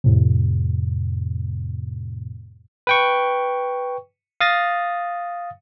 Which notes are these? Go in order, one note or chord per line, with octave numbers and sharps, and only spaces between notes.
F2 A2 C3
B4 G5 C#6
F5 D#6 A6 A#6